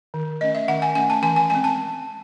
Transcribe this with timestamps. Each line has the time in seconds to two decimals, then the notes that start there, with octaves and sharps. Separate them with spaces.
0.14 D#3
0.41 A3 C#4 D#5
0.55 E5
0.68 D#3 F#5
0.82 G#5
0.95 A3 C#4 G#5
1.10 A5
1.23 E3 G#5
1.36 G#5
1.50 G#3 C4 G#5
1.64 A5